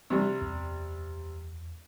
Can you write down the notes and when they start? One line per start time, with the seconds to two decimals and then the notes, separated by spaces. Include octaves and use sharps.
0.10 C3 G3
0.42 E2